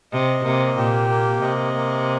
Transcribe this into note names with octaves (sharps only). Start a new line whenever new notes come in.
C3 D#5
C3 A#3
A#2 G4
A#3
C3 D#5
A#3